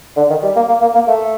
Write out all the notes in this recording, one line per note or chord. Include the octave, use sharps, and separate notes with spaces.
D3
D#3
G3
A#3
A#3
A#3
A#3
A3